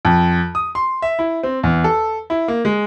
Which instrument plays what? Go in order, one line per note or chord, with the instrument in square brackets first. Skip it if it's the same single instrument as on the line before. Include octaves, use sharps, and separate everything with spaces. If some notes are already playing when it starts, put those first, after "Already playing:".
[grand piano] F2
D#6
C6
E5
E4
C4
E2
A4
E4
A#3
G#3